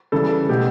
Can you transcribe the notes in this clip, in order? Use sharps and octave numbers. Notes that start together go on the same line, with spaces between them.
C#3 E3 G3 A4
B2 A3 G4